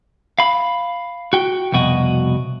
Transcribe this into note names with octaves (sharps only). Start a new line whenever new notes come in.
F5 B5
F#4 G5
C2 F2 B2 F#4 D#5